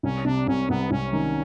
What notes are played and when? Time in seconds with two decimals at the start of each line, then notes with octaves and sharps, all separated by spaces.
0.03 C2 C#4
0.25 C3 D4
0.47 C2 C#4
0.69 C2 B3
0.91 C2 C#4
1.13 D#3